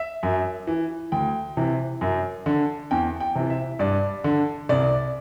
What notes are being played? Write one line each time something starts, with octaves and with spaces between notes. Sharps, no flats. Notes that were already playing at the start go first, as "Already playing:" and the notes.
Already playing: E5
F#2
E3
D2 G5
C3 E3
F#2
D3
E2 G5
G5
C3 E3
E5
G2 D5
D3
C2 D5